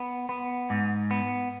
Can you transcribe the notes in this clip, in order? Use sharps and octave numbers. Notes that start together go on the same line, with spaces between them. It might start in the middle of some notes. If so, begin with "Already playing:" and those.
Already playing: B3
B3
G#2
B3